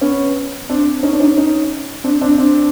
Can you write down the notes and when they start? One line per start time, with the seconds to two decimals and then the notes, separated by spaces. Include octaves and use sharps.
0.01 B3 C#4
0.69 C4 D4
1.03 C#4 D#4
1.13 D4
1.20 C#4 D#4
1.37 C#4 D#4
2.04 C4 D4
2.21 C4 D4
2.38 C4 D4